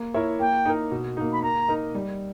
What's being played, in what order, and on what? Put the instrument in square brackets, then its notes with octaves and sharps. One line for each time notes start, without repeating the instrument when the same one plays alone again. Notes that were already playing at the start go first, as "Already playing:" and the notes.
Already playing: [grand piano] A#3
E4 A#4 C#5 E5
[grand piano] A#3 [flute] G5
[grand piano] D#4 A#4
B2
A#3 D#4
[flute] B5
[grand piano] A#3 [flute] A#5
[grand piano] D#4 A#4 D#5
G3